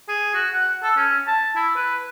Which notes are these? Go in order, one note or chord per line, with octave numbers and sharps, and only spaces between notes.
G#4
F#4
F#5
A4
C#4
A5
E4
B4